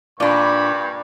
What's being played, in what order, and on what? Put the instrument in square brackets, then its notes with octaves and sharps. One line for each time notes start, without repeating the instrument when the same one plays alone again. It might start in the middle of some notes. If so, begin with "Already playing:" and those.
[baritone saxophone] G2 [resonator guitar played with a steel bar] A#2 D4 [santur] D5 A#5 [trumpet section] B5 C#6